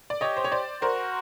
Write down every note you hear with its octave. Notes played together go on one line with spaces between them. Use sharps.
D5
G4 C#5 D#5
C5
C#5
C5 D5
F#4 A#4 C5